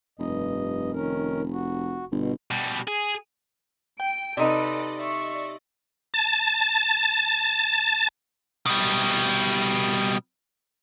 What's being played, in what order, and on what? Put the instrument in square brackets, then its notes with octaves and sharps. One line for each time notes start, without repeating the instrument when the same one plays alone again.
[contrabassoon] F1 [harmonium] G2 D#5
[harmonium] D#3 C#4 A#4
F#4
[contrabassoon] G1 [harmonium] B2
[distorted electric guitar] B2 G3
G#4
[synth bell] G5 [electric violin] D7
[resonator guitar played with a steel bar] C3 D#4 [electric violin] A4 B4 [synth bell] D5 D#5
[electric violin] E5 C#6
[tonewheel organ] A5 A6
[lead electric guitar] B2 G3